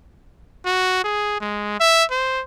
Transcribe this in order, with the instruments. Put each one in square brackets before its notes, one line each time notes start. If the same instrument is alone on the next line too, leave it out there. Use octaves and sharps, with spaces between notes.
[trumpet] F#4
G#4
G#3
E5
C5